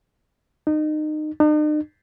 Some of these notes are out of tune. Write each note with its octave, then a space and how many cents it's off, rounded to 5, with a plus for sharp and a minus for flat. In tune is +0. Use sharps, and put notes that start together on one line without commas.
D#4 -25
D#4 -45